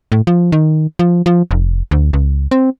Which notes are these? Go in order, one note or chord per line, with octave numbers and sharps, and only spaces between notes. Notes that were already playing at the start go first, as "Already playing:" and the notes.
A2
F3
D#3
F3
F3
F1
D2
C#2
C4